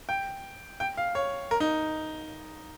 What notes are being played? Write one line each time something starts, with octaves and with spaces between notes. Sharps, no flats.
G5
G5
F5
C#5
A#4
D#4